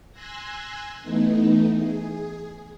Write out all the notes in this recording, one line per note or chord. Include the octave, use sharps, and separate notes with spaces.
G#5 C6 E6 F#6 G#6 A#6
E3 A3 B3 D#4
G#4